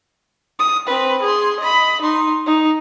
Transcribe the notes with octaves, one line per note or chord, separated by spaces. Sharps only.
D#6
C4 B4
G#4 C6
D#5 B5
D#4 C6
D#4